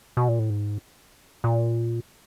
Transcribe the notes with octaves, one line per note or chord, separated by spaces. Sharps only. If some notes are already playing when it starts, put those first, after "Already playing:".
B2
A#2
A2
G#2
A#2